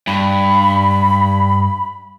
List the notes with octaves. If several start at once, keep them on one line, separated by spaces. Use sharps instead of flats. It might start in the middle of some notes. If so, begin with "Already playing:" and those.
G2 B5